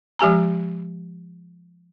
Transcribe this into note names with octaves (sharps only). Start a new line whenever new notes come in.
F3 G#3 G4 G#5 A#5